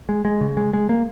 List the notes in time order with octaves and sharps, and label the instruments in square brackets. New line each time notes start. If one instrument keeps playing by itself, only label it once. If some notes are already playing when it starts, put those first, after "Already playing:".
[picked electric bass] G#3
G#3
C#3
G#3
G#3
A#3